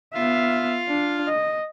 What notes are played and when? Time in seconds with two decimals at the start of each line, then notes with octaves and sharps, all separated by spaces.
0.14 B3 F4 E5 F5
0.88 D4
1.28 D#5